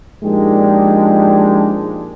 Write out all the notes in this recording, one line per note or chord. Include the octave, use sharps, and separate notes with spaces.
A#2 F3 G#3 D4 D#4 G4